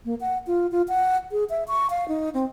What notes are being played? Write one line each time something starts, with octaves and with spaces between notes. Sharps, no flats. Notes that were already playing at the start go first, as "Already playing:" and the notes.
A#3
F#5
F4
F4
F#5
G#4
E5
C#6
F5
D#4
C4